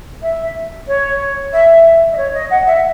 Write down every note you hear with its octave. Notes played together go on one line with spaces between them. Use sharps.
E5
C#5
E5
D#5
C#5
D#5
F#5
E5